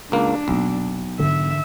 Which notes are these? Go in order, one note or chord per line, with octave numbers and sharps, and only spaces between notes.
C#2 A#3 D4
F1 B1 A#3
G#2 D3 E3 E5